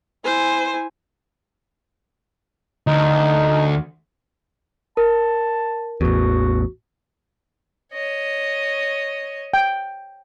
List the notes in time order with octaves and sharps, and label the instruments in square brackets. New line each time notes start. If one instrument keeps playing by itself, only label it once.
[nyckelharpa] E4 G#5 [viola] C5
[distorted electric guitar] D2 [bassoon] D#4
[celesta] A#4 [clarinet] A5
[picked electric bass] A1 E2 [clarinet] F#4
[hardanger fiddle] C#5 D#5
[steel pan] G5